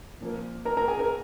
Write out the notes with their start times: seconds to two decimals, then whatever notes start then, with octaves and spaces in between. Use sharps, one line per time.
0.21 A#2 F3 A#3
0.65 A#4 A#5
0.77 A#4 A#5
0.88 G#4 G#5
0.99 A#4 A#5